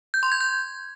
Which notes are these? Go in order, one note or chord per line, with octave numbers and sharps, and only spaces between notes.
G6
C6
G#6
G6